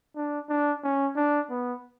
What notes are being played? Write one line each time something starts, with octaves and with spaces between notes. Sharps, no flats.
D4
D4
C#4
D4
B3